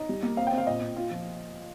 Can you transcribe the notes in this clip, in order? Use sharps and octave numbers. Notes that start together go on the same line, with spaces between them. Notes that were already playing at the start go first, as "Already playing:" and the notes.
Already playing: D#4 D#5
G3
A#3
C4 F5
G5
C4
F5
A#2 D#5
A#2
F4
F3